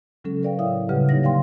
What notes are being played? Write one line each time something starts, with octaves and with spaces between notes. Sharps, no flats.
C#3 F#3 G#3 C#4 A4
A#4 B4 D5 F5 G5
A2 E4 C#5 E5 F5 D#6
A#2 C#3 G3 G4 B4 F#5
D3 F#3 A#3 D#4 C#5 A#6
D5 F5 G5 C6